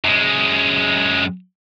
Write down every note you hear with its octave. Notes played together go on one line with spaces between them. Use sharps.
F#2 G#3